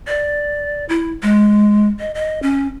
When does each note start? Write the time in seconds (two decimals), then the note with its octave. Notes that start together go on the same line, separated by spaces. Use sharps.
0.07 D5
0.89 E4
1.22 G#3
1.99 D#5
2.15 D#5
2.42 C#4